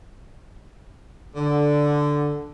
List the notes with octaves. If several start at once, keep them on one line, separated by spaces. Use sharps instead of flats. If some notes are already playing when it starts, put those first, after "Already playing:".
D3